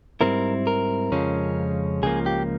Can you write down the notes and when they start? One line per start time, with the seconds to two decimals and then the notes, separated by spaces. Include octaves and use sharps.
0.21 G#2 G3 C4 E4 A#4
0.67 A#4
1.12 F2 C#3 F3 G#3 C#4
2.03 C#2 C#3 F3 A#3 G#4
2.26 G4